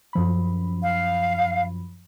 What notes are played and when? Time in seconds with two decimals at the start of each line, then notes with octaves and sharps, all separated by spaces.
0.13 F#2 F3 B5
0.82 F5